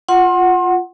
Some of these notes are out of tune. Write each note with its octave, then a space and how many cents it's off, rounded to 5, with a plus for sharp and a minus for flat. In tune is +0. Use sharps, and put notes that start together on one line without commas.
F4 +0 F#5 +0 C6 +30